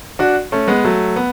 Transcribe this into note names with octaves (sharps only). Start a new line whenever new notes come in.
D4 F#4
A3 C#4
G#3 B3
F#3 A3
B3